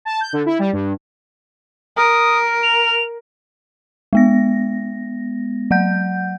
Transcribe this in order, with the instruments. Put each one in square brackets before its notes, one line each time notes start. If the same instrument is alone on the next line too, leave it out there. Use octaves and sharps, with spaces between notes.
[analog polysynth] A5
G6
D3
E4
G3
G2
[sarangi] A#4 [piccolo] D#6
[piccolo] F7
[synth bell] G#3 B3 A#6
F#3 F#5 G6